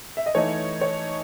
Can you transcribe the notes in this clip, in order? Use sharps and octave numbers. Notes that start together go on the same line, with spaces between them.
E5
D#5
E3 A3 D#4 C#5
C#5